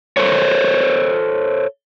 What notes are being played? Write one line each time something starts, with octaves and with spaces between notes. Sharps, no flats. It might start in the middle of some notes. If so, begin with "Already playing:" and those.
A4 C5 C#5